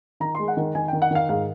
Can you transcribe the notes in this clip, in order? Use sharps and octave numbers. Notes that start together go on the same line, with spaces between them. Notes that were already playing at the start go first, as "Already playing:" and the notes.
D#3 A#5
G#3 C6
F#5
D#3
D#3 G#5
G5
D#3
F#5
D#3 F5
G#2 F5